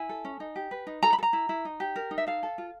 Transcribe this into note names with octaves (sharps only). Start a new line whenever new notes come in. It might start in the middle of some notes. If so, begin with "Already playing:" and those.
Already playing: E4 G#5
A4
C#4
D#4
G4
B4
D#4
A4 A#5
B5
A4
A#5
E4
E4
D#4
G4
A#4
D#4
E5
A4 F5
A4
F4